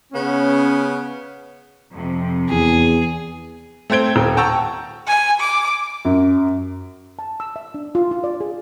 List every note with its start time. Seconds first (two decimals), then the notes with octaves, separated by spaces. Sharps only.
0.12 C#3 B3 C#4
1.91 F2 C3
2.49 E2 G#4
3.90 A3 C4 C5 G#6 D7 G7
4.16 D#1 D#2
4.37 F#5 G5 A5 A#5 C#6 E6
5.07 G#5
5.40 D6
6.05 F#2
7.19 A5
7.40 E6
7.56 E5
7.74 D4
7.95 F4
8.11 F4
8.24 D5
8.41 G#4